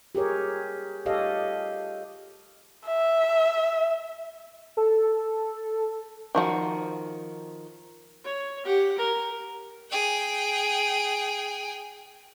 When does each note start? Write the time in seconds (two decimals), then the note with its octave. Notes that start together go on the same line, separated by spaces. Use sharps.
0.15 G4 G#4 A#4 C#5
1.06 G4 A4 C#5 D#5 F5
2.87 E5
4.77 A4
6.35 D#3 F3 F#4
8.24 C#5
8.65 G4 F#5
8.98 A#4
9.91 G#4 G5